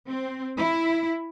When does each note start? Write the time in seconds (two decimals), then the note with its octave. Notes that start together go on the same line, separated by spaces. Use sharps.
0.10 C4
0.58 E4